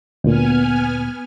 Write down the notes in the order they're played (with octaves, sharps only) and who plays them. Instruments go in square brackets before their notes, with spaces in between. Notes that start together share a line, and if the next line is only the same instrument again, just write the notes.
[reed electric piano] D2 A#2 [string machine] B3 G#5 F6